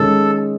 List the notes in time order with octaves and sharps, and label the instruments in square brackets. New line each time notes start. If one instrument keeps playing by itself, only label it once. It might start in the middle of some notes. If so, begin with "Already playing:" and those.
Already playing: [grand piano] D#3 G#3 C#4 [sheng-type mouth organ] A4